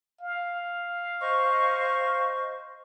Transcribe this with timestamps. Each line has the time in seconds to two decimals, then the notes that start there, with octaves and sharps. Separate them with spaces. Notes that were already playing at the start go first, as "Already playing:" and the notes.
0.21 F5
1.20 C5 D#5 C#6